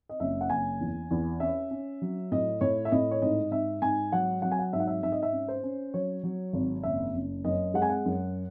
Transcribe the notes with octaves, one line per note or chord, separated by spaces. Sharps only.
D#5
F#1 E5
F#5
F#1 G#5
E2
E2
C#4 E5
C#4
F#3
A2 D#5
A2 C#5
E5
A2 D#5
C#5
G#2 D#5
G#2 E5
G#2 G#5
F#3 F#5
F#3 F#5
G#5
F#5
G#2 E5
F#5
E5
G#2 E5
D#5
E5
C#4
C5
C#4
F#3 C#5
F#3
G#1
F#1 E5
F#1
F#2 D#5
G#3 F#5
G#5
F#5
F#2